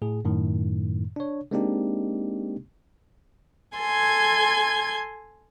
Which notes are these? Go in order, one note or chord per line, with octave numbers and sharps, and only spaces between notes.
A2 G#4
F#2 A2 D#3
D4 C#5
G#3 A#3 C4 D4 D#4 G4
A4 G#5 C6 G#6